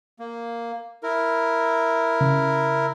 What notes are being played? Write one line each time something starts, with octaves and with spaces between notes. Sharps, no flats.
A#3
E4 A#4
C#3